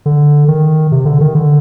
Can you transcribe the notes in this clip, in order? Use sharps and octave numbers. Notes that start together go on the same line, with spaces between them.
D3
D#3
C3
D3
D#3
D3